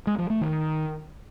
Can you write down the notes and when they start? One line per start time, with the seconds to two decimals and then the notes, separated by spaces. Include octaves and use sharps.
0.07 G#3
0.18 F3
0.30 A3
0.41 D#3